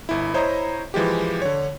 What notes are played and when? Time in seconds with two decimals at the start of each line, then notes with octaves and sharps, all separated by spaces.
0.09 G1 E4
0.34 E4 C5 C#5 D#5 A#5 D#6
0.94 E3 F3 G#3 G4
1.42 D3 C#5